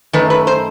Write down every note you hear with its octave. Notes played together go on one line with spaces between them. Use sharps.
F#2 D#3 A3 B4
B4
C5